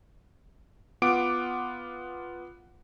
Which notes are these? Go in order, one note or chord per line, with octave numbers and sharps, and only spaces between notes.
B3 F4 F#5 D6 D7